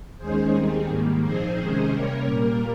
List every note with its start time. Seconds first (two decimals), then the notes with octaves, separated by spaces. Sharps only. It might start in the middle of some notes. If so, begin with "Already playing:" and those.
0.18 D#2 D#3 G#3 C#4 G#4 C5
0.53 D#2 D#3 G3 C4 D#4 G#4
0.87 G#2 D#3 G3 A#3
1.22 A#2 F3 C4 D#4 G#4 C5
1.57 C3 D#3 G#3 C#4
1.91 C3 G3 A#3 C#4 A#4 C#5
2.26 A#2 G3 A#3 A#4